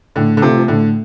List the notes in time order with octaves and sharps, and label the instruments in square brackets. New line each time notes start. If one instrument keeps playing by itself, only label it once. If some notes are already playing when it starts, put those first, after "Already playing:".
[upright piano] A2 [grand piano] D3
[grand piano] D3
[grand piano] C3 [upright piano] A3 F4 A4
[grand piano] F3
[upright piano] A2 [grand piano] D3